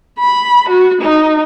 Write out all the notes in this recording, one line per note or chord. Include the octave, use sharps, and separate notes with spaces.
B5
F#4
D#4